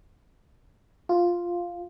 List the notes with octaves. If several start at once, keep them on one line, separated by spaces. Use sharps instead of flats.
F4